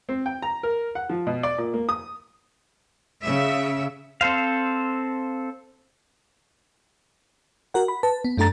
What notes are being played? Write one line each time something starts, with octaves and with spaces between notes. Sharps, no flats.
C4
G5
A#5
A#4
F#5
F3
B2
D5
A#2
A#3
D#6
C#3 E5
C4 A4 C5 F5
F#4 A#4 F#5
B5
B4 A5
B3
F#2 A3 D4 A4 A#5 A6